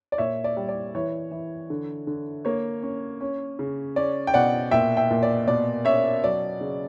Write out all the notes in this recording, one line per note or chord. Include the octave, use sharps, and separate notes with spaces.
D5
A#2 C#5 E5
D5
G3
D5
E3 C#5
E3
D3
D3
A#3 C#5
C#4
C#4
C#3
C#4 D5
G5
B2 D5 F#5
A#2 E5 G5
E5 G5
A#2
D5
B2 D5
C#4 C#5 E5
F#3 D5
C#3